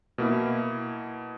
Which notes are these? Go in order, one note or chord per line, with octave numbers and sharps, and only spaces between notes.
B2 A#3 E4